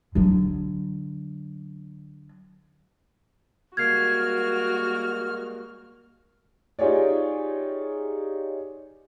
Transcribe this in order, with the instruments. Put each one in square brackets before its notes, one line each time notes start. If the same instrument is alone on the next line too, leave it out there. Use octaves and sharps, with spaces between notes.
[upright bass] D3 F#3
[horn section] G3 G#3 A#3 [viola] F#4 [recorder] F6 [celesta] G#6 C7
[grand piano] D#4 F4 G4 G#4 C#5 D5